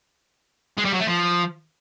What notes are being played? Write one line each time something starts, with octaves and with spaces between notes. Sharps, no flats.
G#3
G3
F#3
A3
F3